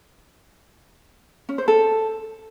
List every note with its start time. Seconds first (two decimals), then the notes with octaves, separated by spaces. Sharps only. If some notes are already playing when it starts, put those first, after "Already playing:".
1.49 C#4
1.58 C5
1.68 A4